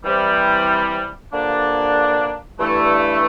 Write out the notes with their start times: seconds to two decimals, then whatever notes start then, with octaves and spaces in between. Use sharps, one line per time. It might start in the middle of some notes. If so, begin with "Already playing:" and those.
0.04 C3 E3 G3
1.32 G2 D3 F3 A#3 D4
2.59 G2 E3 A3